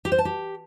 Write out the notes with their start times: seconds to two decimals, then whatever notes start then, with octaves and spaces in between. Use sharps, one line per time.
0.05 G4
0.12 C5
0.18 A5
0.25 G4